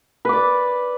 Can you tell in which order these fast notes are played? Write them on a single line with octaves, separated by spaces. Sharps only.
B4 D6 D5